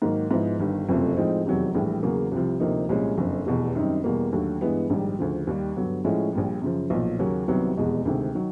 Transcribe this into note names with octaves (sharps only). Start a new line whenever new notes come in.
G#2 D#3 F#3 A#3
G#2 F3 G#3 B3 E4
G1 G2 D#3
F#1 F2 C3 F3 A3
A2 F3 G#3 C4 D#4
F1 E2 C3 D#3 F#3
A#1 A2 E3 G3
E2 C#3 F#3 A#3
C2 C3 F3
D2 C3 F3 A#3 D#4
C2 A#2 F3 G#3 C#4
F#1 F2 D3
F1 E2 B2
F#2 D#3 G3 C4 D#4
E2 B2 G3 A#3
D#2 D3 F#3 A3
G2 E3 G#3 B3
A#1 G#2 D#3 G3
D2 C#3 F3
D#2 D#3 G3
G2 D3 F#3 B3
A2 F3 G#3 C#4 E4
A#1 A#2 G3
F#2 C#3 F3
B1 A#2 F3
D#2 C#3 F#3 A#3 C#4
C2 C3 D#3 F#3 B3
F1 E2 B2 G#3
D2 C3 D#3 G#3
D#3 F#3